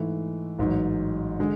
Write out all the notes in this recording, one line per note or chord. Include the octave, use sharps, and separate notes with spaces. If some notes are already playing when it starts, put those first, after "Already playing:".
Already playing: G#2 E3 A3
A1 G#2 F#3
D3 G#3